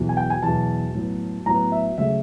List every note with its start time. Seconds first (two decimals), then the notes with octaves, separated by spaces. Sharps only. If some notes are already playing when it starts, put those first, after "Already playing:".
Already playing: E2 B2 F#3
0.09 G#5
0.17 G5
0.30 G#5
0.43 E2 B2 F#3 A5
0.95 A2 F#3 B3
1.46 A2 F#3 B3 A#5
1.72 E5
1.98 C#3 F#3 A3 E5